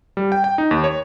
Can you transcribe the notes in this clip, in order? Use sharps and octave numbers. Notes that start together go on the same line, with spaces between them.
G3
G5
G5
D#4
D#2
C#5